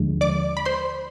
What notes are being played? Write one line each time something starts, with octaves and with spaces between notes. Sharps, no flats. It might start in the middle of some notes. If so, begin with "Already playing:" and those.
Already playing: D#2 D3 F3 G#3
D5 D6
B5
C5 C6